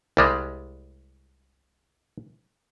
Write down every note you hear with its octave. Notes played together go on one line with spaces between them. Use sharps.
C2 G3 G#3